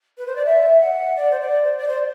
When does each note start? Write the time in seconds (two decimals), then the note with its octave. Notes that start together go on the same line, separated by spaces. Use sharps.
0.18 B4
0.27 C5
0.35 D5
0.45 E5
0.80 F#5
1.16 D5
1.31 C5
1.40 D5
1.63 C5
1.77 D5
1.88 C5